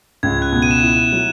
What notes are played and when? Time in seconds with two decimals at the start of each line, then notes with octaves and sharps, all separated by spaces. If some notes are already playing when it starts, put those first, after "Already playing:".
0.23 C#2 G#6
0.42 F#6
0.52 B2
0.62 D#7
0.71 E7
0.80 E4 D#7
1.12 F#3